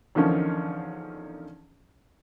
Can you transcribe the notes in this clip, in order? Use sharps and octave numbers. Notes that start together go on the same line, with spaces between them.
E2 D3 D#3 F3 C#4 D#4